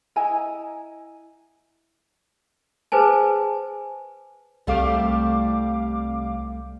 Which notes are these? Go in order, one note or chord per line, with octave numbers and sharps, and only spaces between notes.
E4 D#5 G#5 A#5
G#4 B4 C5 G#5 A5
C2 G3 A3 F5 D6